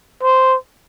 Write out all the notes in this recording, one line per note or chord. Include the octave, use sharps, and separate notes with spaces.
C5